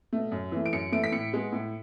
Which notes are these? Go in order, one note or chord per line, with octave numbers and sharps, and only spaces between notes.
B2 A3
F#2
E3 A3
D7
F#2 C#7
E3 A3 D7
B6
A2 C#7
G#3 B3
A2